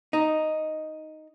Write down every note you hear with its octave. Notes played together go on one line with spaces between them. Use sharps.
D#4